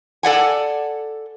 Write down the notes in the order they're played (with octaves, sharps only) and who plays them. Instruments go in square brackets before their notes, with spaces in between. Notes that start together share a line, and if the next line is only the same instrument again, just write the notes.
[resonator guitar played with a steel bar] A4 D5 F#5 G#5